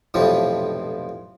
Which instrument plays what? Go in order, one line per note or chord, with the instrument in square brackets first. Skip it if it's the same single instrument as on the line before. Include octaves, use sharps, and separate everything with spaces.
[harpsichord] B1 F2 A2 C3 E3 F3